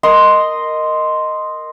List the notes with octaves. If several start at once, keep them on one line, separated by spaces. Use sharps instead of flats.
A#4 D#5 C6